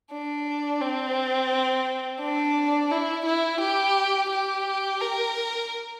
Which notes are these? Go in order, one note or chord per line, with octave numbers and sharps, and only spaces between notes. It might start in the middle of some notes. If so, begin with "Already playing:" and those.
D4
C4
D4
E4
E4
G4
G4
A#4